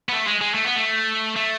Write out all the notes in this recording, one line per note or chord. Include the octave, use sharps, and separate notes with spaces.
B3
A3
G#3
G#3
A3
B3
A3
A3